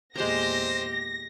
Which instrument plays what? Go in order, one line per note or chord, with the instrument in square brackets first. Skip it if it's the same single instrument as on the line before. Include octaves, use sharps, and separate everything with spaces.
[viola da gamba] E2 A#2 G4 [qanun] G#3 A#5 [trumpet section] C5 [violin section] A#6